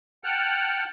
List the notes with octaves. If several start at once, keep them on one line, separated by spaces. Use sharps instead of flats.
F#5 G5 A5 F6 F#6